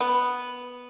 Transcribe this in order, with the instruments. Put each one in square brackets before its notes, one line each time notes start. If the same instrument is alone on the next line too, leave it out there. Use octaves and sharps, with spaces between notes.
[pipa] B3